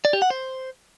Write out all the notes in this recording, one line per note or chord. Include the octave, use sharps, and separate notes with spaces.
D5
G4
F#5
C5